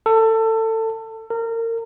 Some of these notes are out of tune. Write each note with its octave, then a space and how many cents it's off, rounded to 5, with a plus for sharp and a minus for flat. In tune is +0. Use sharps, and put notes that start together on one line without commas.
A4 +25
A#4 -30